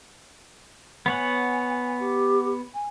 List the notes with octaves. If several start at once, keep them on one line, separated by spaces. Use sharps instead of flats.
B3 C#5 F#5 G#5
G4
G#5